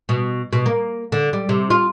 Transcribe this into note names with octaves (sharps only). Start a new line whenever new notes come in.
B2
B2
A#3
D3
G3
C3
F4